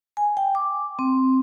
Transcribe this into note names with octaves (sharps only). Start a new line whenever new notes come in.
G#5
G5
D6
C4